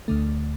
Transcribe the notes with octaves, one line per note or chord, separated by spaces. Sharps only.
D2 D3 A3